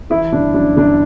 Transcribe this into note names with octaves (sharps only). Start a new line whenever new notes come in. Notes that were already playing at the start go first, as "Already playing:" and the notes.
E3 E4
G1 D4
F#2 D4
G1 D4